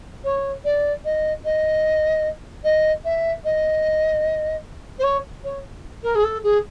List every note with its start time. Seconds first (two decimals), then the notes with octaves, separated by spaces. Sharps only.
0.24 C#5
0.64 D5
1.04 D#5
1.44 D#5
2.63 D#5
3.04 E5
3.44 D#5
4.98 C5
5.03 C#5
5.44 C#5
6.03 A#4
6.15 G#4
6.23 A4
6.43 G#4